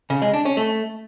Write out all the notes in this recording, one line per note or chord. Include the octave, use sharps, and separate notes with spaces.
C#3
G#3
D4
C#4
A3